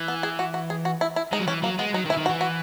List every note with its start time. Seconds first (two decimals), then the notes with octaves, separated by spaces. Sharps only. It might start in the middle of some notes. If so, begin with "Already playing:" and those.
Already playing: E3
0.08 B3
0.23 G#4
0.39 F#4
0.54 F#4
0.70 G#4
0.85 F#4
1.01 E4
1.16 E4
1.33 G#3 D#4
1.40 F#3
1.48 E3 C#4
1.63 F#3 A#3
1.79 G#3 B3
1.94 F#3 D#4
2.06 D#3
2.10 E3 E4
2.17 D#3
2.26 F#4
2.29 E3
2.41 F#4